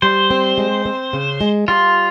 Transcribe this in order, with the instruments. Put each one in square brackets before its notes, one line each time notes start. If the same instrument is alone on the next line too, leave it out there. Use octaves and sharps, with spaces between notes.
[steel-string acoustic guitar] G3 [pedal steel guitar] C5
[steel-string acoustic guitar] C4
G#3
C4
C#3
G#3
[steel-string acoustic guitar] G3 [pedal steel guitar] F4